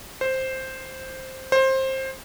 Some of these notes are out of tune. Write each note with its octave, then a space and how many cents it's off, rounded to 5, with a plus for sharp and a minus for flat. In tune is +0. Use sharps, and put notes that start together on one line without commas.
C5 +5
C5 +20